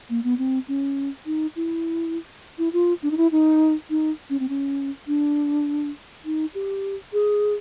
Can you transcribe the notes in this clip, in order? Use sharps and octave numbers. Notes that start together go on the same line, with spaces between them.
A#3
B3
C4
C#4
D#4
E4
E4
F4
D4
D#4
E4
D#4
D#4
C#4
C4
C#4
D4
D#4
G4
G#4